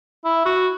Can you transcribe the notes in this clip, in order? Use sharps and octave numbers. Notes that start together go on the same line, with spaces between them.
E4
F#4